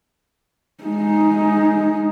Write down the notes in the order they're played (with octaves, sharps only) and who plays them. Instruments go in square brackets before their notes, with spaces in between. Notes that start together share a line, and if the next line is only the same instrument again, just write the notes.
[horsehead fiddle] G#3 D#4